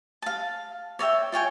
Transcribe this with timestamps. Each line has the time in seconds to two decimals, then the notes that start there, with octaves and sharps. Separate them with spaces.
0.22 F5 A5
0.99 C#5 D5 E5 G5
1.32 F4 C#5 G5 G#5